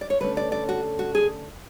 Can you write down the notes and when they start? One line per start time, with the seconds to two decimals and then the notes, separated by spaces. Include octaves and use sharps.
0.01 D5
0.10 C#5
0.21 D3 A3 C#4 B4
0.37 D5
0.52 D5
0.69 F#4
0.99 F#4
1.15 G#4